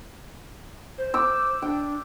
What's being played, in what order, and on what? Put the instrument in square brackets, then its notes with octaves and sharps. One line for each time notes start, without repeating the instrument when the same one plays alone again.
[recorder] C5
[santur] D6 E6
[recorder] D4 [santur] G5